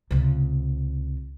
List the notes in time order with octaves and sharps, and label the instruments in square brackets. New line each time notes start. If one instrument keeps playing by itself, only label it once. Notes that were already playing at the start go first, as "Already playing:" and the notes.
[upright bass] C#2 C3